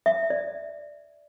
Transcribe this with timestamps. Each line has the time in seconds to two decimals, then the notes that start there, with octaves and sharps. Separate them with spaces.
0.06 E5
0.30 D5